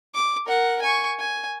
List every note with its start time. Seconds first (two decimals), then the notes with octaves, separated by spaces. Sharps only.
0.14 D6
0.46 A#4 F#5
0.82 G#5 C#6
1.20 G#5